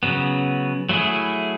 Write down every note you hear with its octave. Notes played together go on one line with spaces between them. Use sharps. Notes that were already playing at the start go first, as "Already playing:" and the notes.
C#3 F#3 B3
F#3 A3 E4 G#4